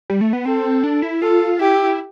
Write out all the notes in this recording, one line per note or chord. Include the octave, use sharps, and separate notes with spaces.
G3
A3
B3
C4 A4
D4
E4
F4 A4
E4 G4